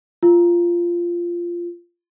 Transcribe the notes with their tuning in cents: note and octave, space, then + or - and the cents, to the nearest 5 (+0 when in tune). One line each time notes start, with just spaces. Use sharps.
F4 -10